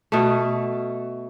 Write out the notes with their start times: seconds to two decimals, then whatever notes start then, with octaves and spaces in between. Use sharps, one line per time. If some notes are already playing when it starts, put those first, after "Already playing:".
0.12 B2 A3